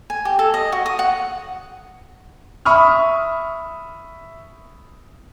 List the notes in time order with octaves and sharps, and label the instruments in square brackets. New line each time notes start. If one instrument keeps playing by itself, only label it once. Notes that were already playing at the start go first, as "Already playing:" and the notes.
[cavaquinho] G#5
G4
A4
D#5
F#4
D#6
F#5
[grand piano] E5 B5 C#6 D#6 F6